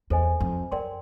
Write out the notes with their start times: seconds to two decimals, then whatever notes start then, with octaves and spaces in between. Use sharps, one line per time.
0.10 E2 A4 C5 D#5 G#5
0.40 F2
0.72 F#2 A#4 D5 G5 C6